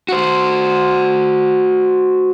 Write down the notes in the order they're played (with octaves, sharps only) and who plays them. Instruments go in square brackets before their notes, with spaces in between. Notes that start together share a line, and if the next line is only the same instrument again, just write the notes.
[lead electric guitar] F#4 C5